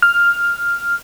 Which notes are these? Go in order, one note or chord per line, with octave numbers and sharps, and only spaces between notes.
F6